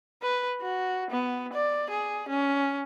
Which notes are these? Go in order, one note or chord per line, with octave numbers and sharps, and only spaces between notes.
B4
F#4
B3
D5
G#4
C#4